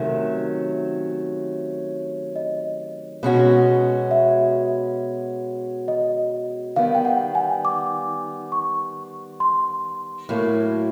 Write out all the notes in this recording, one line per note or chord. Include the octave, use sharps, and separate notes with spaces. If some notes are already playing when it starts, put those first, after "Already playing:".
Already playing: C3 D#3 F#3 A3 C#4 E5
D#5
B2 G#3 C#4 F#4
E5
D#5
D#3 G3 B3 F5
G5
F#5
G#5
D6
C#6
C6
A2 F#3 A#3